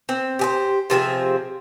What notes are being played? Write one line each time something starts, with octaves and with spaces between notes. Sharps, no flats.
C4
G4 G#4 C5
C3 F3 C4 G#4